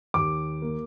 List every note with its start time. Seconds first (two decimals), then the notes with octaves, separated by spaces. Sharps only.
0.14 D#2 D6
0.62 A#3